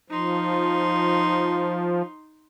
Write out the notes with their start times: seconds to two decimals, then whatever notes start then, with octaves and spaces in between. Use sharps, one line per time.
0.10 F3 D#4 C6